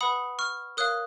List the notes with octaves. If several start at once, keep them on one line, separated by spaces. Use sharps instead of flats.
B4 F#5 B5 D#6
C#6 F6
A#4 C#5 F5 D#6 F#6